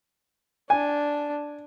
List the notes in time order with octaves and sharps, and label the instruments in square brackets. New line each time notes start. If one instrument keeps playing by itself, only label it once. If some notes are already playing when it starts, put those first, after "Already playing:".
[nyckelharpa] D4 [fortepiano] G#5